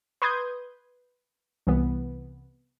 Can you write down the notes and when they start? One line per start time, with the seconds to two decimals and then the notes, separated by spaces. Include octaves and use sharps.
0.22 B4 C6 D#6 G6 G#6
1.67 C2 E3 B3